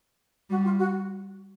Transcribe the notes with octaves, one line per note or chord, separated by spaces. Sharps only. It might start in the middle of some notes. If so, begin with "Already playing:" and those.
G3 F#4
F4
F#4